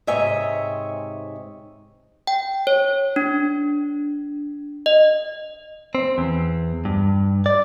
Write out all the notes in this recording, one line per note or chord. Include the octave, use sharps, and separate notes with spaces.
G#2 C3 C#5 D#5 E5 G#5
G5
C#5
D4
D#5
C4
E2
G2
D5